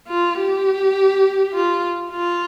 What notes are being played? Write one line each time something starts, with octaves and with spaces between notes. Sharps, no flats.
F4
G4
F4
F4